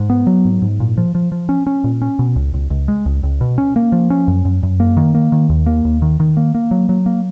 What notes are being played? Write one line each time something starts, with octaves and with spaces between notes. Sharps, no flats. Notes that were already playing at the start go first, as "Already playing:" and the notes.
Already playing: G#2
B3
F#3
G#2
G#2
A#2
F3
F3
F3
C#4
C#4
A#2
C#4
B2
C#2
C#2
C#2
G#3
C#2
C#2
B2
C#4
A#3
F3
C#4
F#2
F#2
F#2
A#3
D#3
A#3
D#3
D#2
A#3
D#2
D#3
D#3
A#3
A#3
F#3
F#3
A#3